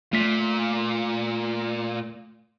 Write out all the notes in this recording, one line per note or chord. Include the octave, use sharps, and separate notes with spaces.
A#2 A3 B6